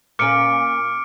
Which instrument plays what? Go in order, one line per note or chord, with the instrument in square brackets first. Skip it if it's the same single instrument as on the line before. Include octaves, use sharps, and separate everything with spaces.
[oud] A#2 C#4 [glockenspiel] D6 C#7 [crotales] F6 D7